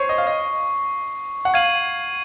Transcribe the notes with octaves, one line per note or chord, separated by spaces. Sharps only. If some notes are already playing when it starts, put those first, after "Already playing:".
Already playing: C5 C#5 C#6 C7
D#5
F5
D#5
F#5
F5 G#6 D#7 F#7